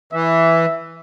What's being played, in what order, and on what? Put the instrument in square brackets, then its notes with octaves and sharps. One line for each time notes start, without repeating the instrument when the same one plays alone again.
[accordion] E3 [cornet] E5